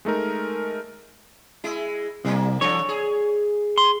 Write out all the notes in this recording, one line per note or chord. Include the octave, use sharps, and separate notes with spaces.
G#3 A3 D#4 A#4
G#3 E4
C2 G3 A#3
E3 D4 A4 C#5
G#4
C6